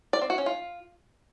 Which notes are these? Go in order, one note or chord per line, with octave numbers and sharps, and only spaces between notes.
D5
C4
F#4
C#4
F4